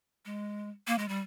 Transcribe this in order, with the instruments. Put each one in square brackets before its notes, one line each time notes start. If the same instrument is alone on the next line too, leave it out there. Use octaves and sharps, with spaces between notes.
[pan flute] G#3
A#3
G#3
G3